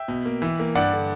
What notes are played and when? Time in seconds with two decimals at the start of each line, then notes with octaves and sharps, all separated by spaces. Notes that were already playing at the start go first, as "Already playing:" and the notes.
Already playing: E5 G5
0.08 B2
0.25 A#3
0.42 E3
0.59 A#3
0.75 G2 D5 F#5
0.92 D3